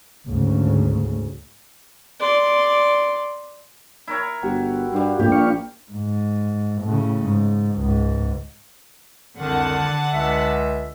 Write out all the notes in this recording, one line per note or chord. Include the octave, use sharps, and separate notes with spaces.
D2 G#2 C#3
D5 C6
E4 A#4 C#5
G1 F#4 G4
G2 G3 F5
A#1 G#2 A3 G4
D4 F5 C#6
G#2
A2 C#3
G#2
C#2 G#2
C2 F2 D3 D#3 F#5 A5
C#2 E5